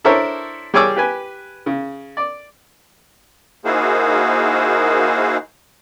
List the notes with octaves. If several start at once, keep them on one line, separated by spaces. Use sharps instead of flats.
D4 E4 A4 A#4 C5 C#5
G3 G#4 C#5 G#5 D6 E6
G4 B4 G#5
C#3
D5
A#3 D#4 E4 F#4 G#4 C5